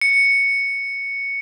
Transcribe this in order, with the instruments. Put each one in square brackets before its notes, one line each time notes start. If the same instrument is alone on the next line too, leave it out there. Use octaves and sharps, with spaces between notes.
[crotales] C#7